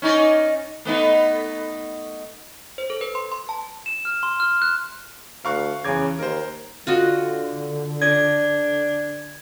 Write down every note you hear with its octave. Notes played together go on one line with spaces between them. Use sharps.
C#4 D#4 D5
A3 B3 D#4
C5
A4
B4
C6
C6
A5
E7
F6
C6
F6
F#6
D2 F5 C#6 F#6
E2 C#3 D6 G#6
D#2 A#4 C5
D3 F4 F#4 D#5
D4 D#5 G#6